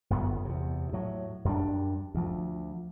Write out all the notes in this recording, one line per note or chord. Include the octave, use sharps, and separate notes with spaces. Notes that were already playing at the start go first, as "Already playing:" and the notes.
G1 F#2 B3
E2 C3
A2 F#3
F#2 G3 D4
D2 F3